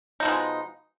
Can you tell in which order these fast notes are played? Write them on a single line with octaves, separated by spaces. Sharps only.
D#4 F3 B2 G#3